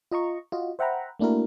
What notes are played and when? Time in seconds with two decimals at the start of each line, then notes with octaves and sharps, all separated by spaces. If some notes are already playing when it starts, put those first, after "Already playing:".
0.11 F4 D#5 A#5 C#6
0.52 F4 F#4 D#5
0.79 C5 E5 F#5 G5 A#5 B5
1.19 A3 A#3 D4 E4 F#4 A#4